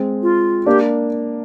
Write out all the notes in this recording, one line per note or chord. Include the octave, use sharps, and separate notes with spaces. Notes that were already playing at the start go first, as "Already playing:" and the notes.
Already playing: G#3 C4
F4
A#3 D4 G4